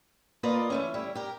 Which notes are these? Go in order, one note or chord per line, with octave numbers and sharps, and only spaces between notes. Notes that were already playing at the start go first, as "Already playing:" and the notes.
A#3 F4 B4 D5 D#5
E3 A3 C#4
G3 E4
G4 A#4